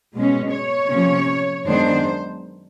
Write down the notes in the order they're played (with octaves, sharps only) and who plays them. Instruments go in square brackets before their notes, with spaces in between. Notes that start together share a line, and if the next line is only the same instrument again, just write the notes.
[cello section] B2 G#3 C#4
C#5
C3 F3 A#3 C#4
F#2 D#3 G#3 B3 D4 C5